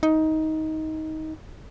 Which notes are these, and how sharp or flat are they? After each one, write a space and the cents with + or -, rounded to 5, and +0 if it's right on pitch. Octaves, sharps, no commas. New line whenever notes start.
D#4 +15